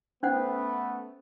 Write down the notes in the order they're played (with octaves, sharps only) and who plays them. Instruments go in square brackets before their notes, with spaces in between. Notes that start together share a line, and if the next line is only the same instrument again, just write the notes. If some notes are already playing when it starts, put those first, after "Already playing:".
[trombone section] A3 B3 [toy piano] C#4 C5 F#5